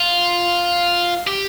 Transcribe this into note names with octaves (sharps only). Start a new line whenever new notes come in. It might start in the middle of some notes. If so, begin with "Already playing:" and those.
Already playing: F4
G4